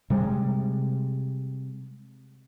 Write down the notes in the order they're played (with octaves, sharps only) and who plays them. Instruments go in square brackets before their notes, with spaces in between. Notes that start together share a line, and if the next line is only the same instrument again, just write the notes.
[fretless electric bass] C3 G3 G#3